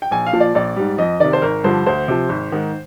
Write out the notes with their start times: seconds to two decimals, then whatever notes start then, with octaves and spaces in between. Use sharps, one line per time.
0.02 G5
0.11 A#1 G#5
0.27 F5
0.33 A#2 F3
0.40 D5
0.55 A#1 D5
0.76 G#2 G3
0.98 F2 D#5
1.20 C3 D#3 D5
1.33 C5
1.42 G#1 A#4
1.64 G2 D3 F3 C5
1.86 D2 C5
2.08 C3 F3
2.29 G#1
2.52 G#2 D#3